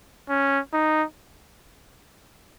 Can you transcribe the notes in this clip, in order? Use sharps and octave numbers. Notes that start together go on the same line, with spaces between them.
C#4
D#4